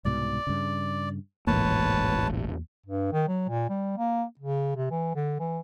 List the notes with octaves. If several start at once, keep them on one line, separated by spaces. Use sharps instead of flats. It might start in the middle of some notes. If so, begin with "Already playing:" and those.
C2 G#2 B2 D5
G2 C#3
E1 A1 E2 G#2 A#3 B4 C#5 A5
G2
D#3
F#3
A#2
G3
A#3
C#3
C3
E3
D3
E3